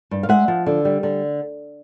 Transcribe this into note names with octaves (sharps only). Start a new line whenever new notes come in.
G2
F5
G#3 E5 F#5
F3
D3
G3
D3